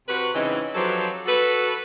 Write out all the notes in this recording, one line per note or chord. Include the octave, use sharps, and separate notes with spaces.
C3 F#4 B4
C#3 E3 G#3 C4 C#4 D#4
F3 F#3 G4 A4 B4 C5
F#4 A4 B4